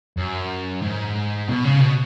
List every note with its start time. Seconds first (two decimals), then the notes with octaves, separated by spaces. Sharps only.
0.17 F#2
0.82 G#2
1.48 B2
1.65 C#3
1.82 B2